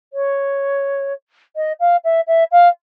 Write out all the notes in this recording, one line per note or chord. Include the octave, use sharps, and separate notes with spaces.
C#5
D#5
F5
E5
E5
F5